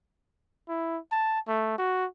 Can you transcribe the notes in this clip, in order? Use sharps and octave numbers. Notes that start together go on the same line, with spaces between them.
E4
A5
A3
F#4